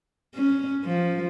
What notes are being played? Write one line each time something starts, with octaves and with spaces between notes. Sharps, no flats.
C#4
F3